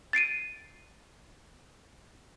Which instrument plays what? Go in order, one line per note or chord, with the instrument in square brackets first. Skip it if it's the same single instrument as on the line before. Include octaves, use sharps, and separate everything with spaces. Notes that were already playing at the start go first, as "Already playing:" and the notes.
[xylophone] A6 C7 D7 D#7